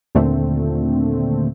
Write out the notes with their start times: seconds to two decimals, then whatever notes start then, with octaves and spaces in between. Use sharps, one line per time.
0.15 D#2 A#2 D3 A3 C4